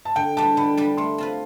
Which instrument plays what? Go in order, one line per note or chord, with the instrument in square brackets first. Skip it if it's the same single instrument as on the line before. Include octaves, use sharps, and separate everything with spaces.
[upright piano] A5
[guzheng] D3 [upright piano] G5
[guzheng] G3 D4 G4 B4 [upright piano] A5
[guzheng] D3 [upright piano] B5
[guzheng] G3 D4 G4 B4
[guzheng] A3 [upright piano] C6
[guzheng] C4 F4 B4